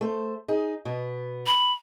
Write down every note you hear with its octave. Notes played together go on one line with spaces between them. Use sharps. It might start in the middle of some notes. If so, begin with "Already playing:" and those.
A3 C5
D#4 G#4
B2 B3
B5